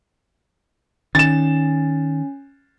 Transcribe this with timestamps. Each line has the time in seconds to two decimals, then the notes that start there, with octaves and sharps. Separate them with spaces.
1.15 D#3 C#4 A6 E7